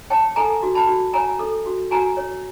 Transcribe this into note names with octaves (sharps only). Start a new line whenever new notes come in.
C#5 G5 A5
A4 G#5 A#5
F#4
A5 B5
F#4
C#5 G#5 A#5
A4
F#4
F#4 G#5 A#5
C#5